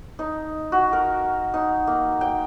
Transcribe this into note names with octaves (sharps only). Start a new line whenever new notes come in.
D#4
F#4
A#4
D#4
A#3
G5